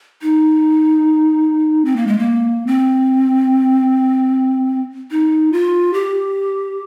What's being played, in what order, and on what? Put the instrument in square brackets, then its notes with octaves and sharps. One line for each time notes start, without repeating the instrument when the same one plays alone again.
[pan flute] D#4
C4
A#3
G#3
A#3
C4
D#4
F4
G4